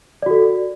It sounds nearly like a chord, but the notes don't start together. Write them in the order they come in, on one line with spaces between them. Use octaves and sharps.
D5 F#4 A4